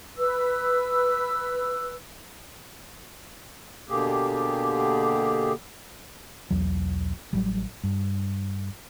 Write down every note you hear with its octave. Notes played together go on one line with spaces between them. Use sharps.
B4 E6
B2 D3 A#3 G4 G#4
B1 E2 F#3
A1 F#3 G3
G2